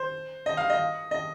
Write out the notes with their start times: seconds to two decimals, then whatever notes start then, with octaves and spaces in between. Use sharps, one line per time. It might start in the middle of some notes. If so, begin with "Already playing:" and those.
Already playing: C5
0.46 D#5
0.57 F5
0.70 D#5
1.11 D#5